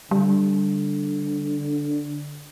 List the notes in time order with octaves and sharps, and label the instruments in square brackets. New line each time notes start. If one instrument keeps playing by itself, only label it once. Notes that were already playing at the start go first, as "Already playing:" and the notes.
[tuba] D3 [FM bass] G3